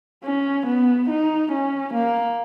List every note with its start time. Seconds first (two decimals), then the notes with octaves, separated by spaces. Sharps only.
0.24 C#4
0.66 B3
1.09 D#4
1.52 C#4
1.94 A#3